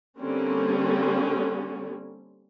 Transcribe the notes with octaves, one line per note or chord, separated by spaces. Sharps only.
D3 G3 A#3 C4 C#4